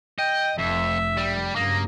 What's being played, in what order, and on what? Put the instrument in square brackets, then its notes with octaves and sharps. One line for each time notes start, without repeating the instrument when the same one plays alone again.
[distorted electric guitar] D#5 [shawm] G5
[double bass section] F1 [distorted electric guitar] F2 [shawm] E5
[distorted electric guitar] G3
[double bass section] G2 C#3 F#3 [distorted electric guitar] A#3 [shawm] D#5